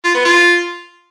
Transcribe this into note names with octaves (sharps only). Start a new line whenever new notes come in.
F4
B3
F4